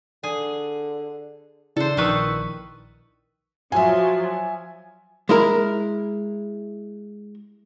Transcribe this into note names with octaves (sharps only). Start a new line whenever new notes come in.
D3 G#4
C#3 D4 E4 A4 C5
A#1 D#3 B4 C#6 E6
F3 F#3 E5 G#5
G#3 E4 A#4